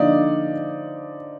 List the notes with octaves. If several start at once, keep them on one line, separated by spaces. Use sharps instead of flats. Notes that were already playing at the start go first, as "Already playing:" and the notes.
Already playing: D3 F3 A#3 D#4 D5